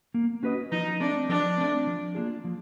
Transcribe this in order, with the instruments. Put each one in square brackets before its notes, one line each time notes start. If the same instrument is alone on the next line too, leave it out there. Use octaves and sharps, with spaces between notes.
[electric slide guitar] A#3
C#4 F#4 B4 D#5
[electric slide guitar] F3 [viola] D#4
[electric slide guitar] A3 C4 [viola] D4
[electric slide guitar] F3 [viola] D4
[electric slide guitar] A3 C4
F3
A#3 D4 F4 G#4
F3